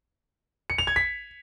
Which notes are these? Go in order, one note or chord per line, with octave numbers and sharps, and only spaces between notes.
C#7
F7
G#6
B6